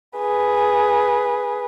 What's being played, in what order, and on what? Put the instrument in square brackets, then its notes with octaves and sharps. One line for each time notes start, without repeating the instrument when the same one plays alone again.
[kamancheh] G#4 B4